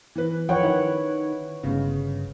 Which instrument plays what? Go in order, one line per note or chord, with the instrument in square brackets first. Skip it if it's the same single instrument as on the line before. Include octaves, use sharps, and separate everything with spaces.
[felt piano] E3 B4
[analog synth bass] F3 [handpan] B4 C#5 F#5 [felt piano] G5
[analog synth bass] D#3 [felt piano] E4
[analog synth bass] G1 [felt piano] C#3 G#3